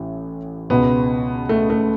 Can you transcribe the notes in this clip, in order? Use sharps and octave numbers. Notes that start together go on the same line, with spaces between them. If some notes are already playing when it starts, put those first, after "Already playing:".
Already playing: A1 A2 E3
C#2 B2 B3
A3
A3